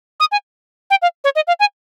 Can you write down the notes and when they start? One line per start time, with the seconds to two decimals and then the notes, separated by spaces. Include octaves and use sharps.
0.20 D#6
0.32 G#5
0.90 G5
1.02 F5
1.24 C#5
1.35 D#5
1.47 F5
1.60 G#5